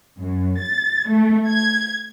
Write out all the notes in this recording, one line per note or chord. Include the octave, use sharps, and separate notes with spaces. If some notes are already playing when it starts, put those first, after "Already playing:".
F#2
A6
A3
G#6